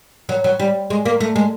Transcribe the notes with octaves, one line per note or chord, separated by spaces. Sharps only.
F#3
F#3
G3
G#3
A#3
A3
G#3